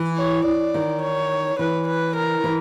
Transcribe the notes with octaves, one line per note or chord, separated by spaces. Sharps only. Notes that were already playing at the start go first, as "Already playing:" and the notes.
Already playing: E3
C#5
D5
D#3
C#5
E3 B4
B4
A#4
E3